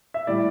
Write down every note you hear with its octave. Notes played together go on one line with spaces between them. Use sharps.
E5
A2 G3 D5